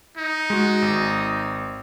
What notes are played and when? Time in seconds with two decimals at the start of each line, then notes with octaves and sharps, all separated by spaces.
0.17 D#4
0.50 G#3 F#4
0.82 G#1